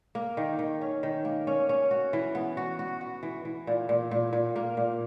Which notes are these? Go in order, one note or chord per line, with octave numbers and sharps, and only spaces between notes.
A#3
D#3
D#3
C#4
D#3
A#3
C#4
C#4
F#4
E3
B3
F#4
F#4
F#4
E3
E3
A#2
A#2
A#2
A#2
A#3
A#2